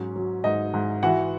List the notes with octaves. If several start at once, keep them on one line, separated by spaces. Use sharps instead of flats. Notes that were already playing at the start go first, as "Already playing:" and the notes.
Already playing: G#2 F#3 C#4
F#3
G#2 D#4 D#5
G#2
E3 F#4 F#5